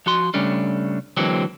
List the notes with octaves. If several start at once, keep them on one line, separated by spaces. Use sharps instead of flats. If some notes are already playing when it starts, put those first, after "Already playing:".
F3 F#4 C6
C#3 G3 A3 C#4 D4
D3 E3 F#3 G#3 A#3 C4